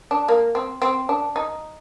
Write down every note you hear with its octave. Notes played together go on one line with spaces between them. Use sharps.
D4
A#3
C4
C4
D4
D#4